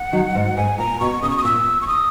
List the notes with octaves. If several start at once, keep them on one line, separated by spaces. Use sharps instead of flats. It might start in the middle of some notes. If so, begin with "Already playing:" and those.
Already playing: F#5
D#3 F#3
G#2
G#2 G#5
A#2 A#5
B2 C#6
C#3 D#6
C#6
D#6
A#2 E6
C#6
D#6